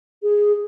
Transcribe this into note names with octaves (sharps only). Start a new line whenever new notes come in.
G#4